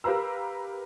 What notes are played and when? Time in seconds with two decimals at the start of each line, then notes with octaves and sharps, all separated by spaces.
0.04 G4 A#4 B4 F5 A#5 E6